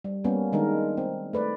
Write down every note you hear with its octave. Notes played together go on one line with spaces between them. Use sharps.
G3
G3 A#3 B3 C#4
D#3 G#3 D4 D#4 A#4
C4
A3 B4 D5